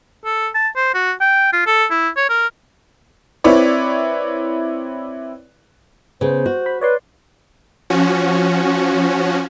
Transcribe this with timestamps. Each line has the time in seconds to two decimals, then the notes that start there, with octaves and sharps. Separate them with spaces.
0.25 A4
0.55 A5
0.76 C5
0.94 F#4
1.21 G5
1.53 F4
1.67 A4
1.91 E4
2.17 C#5
2.30 A#4
3.44 C4 E4 B4 C#5 D5
6.21 C#3 B3 C5
6.46 F#4
6.66 B5
6.81 B4 C#5 D5 C6
7.90 F3 C#4 F#4